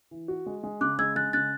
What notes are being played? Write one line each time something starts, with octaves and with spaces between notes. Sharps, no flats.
E3
F#4
G#3
G#3
C#3 D6 F#6
G#3 E6 G#6
G#3 F#6 A6
C#3 F#6 A6